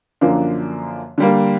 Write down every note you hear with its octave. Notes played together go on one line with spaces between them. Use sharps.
F#2 D3 F3 A#3 D4
D3 G3 A#3